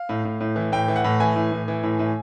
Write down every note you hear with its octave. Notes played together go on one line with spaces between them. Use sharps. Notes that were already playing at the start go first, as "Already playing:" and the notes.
Already playing: F5
A2
A2
A2
E3
A2 G5
E3
F#5
A2
E3 G#5
A2
A2
E3
A2
A2